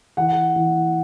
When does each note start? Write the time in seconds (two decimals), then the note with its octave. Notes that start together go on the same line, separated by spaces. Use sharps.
0.17 E3 F#5
0.56 E3